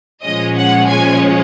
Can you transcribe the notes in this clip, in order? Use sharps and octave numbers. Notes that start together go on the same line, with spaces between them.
A#2 F3 G#3 C#4 D#5
F#5
G#5